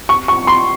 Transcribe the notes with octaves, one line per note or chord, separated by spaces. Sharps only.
C#6
C#6
C6